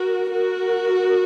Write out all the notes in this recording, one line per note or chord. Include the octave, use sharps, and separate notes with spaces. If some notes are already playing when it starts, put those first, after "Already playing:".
Already playing: F#4 A#4
F#4 A#4